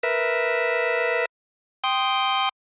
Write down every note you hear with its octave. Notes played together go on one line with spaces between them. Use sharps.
A#4 B4 E5
G5 C6 D#6